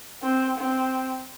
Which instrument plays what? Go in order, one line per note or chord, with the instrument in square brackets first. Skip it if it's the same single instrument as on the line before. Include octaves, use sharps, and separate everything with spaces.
[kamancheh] C4
C4